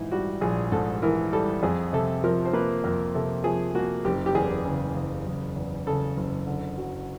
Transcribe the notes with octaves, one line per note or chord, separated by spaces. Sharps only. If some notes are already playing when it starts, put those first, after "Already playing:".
Already playing: A#1 G#2 E3 D#4 E4
G3 F#4
A#1 G#4
G#2 A4
E3 A#4
G3 A4
F2 G#4
C3 A4
F3 A#4
C5
A#3 B4
F2 A#4
C3 A4
F3 G#4
A#3 F#4
F#1 G4
G4
E2 G#4
C#3
F#1
F#1
E2
C#3 A4
F#1
D3
F#3